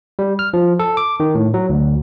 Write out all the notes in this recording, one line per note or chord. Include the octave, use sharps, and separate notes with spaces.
G3
F6
F3
A4
D6
D#3
A2
F#3
D2